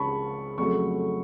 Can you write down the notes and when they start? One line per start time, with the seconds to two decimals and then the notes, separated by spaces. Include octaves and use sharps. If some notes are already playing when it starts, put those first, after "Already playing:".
Already playing: C#2 C#3 G#3 A5 B5 C#6
0.58 F2 C#3 F#3 A3 C#6